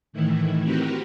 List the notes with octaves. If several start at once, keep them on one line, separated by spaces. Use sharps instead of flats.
A2 D#3 E3 E4
C4 F#4 G4 A#4 B4